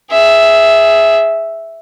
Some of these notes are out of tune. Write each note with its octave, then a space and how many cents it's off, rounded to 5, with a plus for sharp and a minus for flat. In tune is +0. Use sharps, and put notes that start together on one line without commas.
G#4 +0 E5 +0